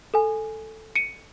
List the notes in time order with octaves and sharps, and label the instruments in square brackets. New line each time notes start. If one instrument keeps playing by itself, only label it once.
[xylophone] A4 G#5
C#7 D#7